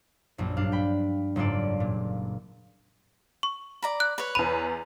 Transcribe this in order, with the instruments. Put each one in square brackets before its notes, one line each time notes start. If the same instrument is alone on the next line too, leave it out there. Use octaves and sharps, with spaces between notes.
[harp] A#1 F#2
G2 D4 F5
G5 B5
F#1 G#2 F4 A4 D5
A#2
[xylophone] C#6
[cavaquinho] D5 A#5 B5
[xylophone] F#6
[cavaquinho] B4 C#5
[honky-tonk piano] E2 D#7 [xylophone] B5